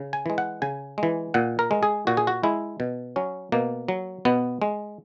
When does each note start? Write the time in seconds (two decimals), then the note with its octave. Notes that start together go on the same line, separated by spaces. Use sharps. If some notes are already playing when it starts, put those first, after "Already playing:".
Already playing: C#3
0.13 G#5
0.26 E3 G#3
0.38 F#5
0.62 C#3 G#5
0.98 G#3
1.03 E3
1.34 A#2 F#5
1.59 A#4
1.71 G#3
1.83 G#4
2.07 A#2 F#4
2.17 G#4
2.27 F#4
2.43 G#3 E4
2.80 B2
3.16 F#3 C#4
3.52 B2 A#3
3.88 F#3
4.25 B2 B3
4.62 G#3